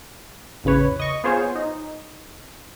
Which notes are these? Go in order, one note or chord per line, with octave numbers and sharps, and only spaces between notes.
A1 E2 C#3 B4 C#5
D#5 C#6
B3 F4 G#4 C5 C#5
D#4